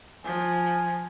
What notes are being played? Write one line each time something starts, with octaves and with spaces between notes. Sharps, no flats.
F3 G#5